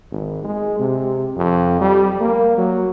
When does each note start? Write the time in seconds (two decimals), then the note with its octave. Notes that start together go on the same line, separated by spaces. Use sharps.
0.11 G#1
0.44 G#3
0.79 C3
1.36 F2
1.81 G3
2.20 A#3
2.58 F#3